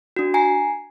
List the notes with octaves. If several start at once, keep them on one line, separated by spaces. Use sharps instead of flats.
D4 F#4
G#5 A#5 C7